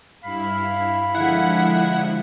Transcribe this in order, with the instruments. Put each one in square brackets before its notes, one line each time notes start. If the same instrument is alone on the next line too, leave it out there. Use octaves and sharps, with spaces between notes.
[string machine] G2 E4 [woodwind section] F5 B5
[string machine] D3 F3 G#3 [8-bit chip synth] E4 F#5